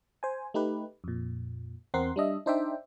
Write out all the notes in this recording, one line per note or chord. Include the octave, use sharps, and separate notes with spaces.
C5 G#5
A3 D#4 G4 B4
F2 A#2
E2 C4 A#4 F#5 C6
G3 D4 D#5 E5
D4 D#4 C5 D5 E5 G5